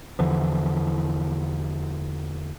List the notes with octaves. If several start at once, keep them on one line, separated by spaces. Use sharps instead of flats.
E2 D3 E3 F3